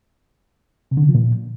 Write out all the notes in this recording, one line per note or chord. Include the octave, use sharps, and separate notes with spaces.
C3
D3
C#3
F3
A#2